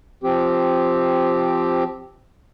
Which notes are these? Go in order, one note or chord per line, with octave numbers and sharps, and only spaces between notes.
F3 C4 G4